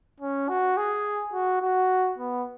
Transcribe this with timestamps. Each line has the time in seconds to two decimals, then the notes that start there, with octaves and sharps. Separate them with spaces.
0.21 C#4
0.49 F#4
0.77 G#4
1.34 F#4
1.62 F#4
2.18 B3